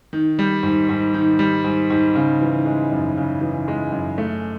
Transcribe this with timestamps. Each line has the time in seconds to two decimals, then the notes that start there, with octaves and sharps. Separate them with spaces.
0.13 D#3
0.39 G3
0.63 G#2
0.89 G#2
1.14 D#3
1.39 G3
1.64 G#2
1.90 G#2
2.15 C#3
2.41 E3
2.65 G#3
2.92 F#2
3.17 C#3
3.41 E3
3.68 G#3
3.92 F#2
4.18 A3